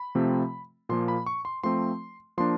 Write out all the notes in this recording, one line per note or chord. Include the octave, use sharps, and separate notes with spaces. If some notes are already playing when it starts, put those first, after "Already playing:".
Already playing: B5
C3 F3 A3 C4
A#2 F3 A#3 C6
B5
C#6
C6
F3 A3 C4 C6
F3 A#3 D4 C6